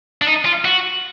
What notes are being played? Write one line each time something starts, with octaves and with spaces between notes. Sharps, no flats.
D4
D#4
F4
F#4